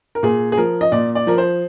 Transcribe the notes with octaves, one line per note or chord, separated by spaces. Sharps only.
A#4
A#2 G#4
G#4
F3 A#4
D#5
A#2 D5
D5
F3 A#4
C5